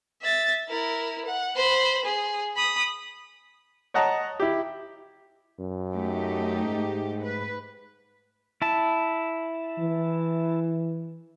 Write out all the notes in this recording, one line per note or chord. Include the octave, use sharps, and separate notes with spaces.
E5 A6
E4 A#4
F#5
C5 B5
G#4
B5 D#6
C#5 D#5 F#5 A5 A#5
E4 G4
F#2
A3 D#4 G4
G#2
B4
E4 A5
E3